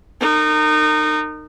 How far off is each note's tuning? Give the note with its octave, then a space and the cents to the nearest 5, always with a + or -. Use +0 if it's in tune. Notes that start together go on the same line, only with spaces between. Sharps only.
D#4 -25 A#4 -30